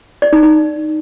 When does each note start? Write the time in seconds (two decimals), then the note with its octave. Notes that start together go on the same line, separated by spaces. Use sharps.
0.22 D5
0.33 D#4
0.43 D#4